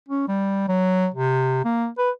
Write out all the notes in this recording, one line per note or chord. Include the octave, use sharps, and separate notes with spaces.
C#4
G3
F#3
C3
A#3
B4